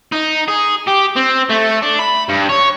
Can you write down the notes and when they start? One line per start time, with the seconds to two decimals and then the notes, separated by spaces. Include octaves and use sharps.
0.12 D#4
0.48 G#4
0.88 G4
1.16 C4
1.49 A3
1.82 D4
1.99 B5
2.29 G2
2.49 C#5